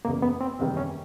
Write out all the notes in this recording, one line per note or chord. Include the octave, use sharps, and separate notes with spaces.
F#1 E2 C#3 A#3
B3
C4
F#1 E2 C3 D#3 G3 C4
C#4